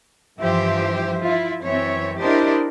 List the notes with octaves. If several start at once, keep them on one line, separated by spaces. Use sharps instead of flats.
G2 E3 F3 G4 C5 E5
E4 F4 E5
F#2 E3 C4 C#5 E5
D4 E4 G4 A#4 C5 D#5